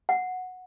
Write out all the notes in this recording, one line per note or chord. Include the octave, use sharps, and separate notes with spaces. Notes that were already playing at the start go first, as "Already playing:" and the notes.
F#5